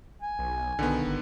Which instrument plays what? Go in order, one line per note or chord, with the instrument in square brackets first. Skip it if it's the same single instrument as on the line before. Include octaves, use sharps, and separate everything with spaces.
[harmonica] G#5
[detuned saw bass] B1
[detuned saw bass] B1 [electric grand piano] D3 D#3 B3
[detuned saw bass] G1